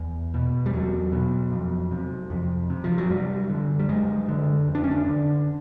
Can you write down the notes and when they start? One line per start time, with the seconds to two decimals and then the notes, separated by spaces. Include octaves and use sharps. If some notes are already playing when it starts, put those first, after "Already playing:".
Already playing: E2
0.34 B2
0.66 G3
0.73 E2 F#3
1.12 B2
1.52 F2
1.91 C3
2.30 F2
2.70 C3
2.84 F3
2.98 F#3
3.10 F#2 G3
3.50 D3
3.79 G3
3.89 F#2 G#3
4.29 D3
4.67 F2
4.75 D4
4.84 C#4
4.91 D4
5.08 D3